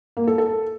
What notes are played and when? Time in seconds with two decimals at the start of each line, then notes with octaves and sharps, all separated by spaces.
0.17 A#3
0.27 A4
0.38 A4